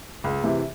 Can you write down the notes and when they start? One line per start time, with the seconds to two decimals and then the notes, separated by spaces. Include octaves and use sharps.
0.24 C#2
0.43 C3 E3